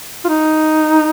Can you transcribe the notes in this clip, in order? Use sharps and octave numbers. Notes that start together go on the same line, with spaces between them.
F4
D#4